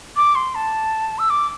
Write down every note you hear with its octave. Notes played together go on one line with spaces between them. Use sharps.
D6
C6
A5
E6
D6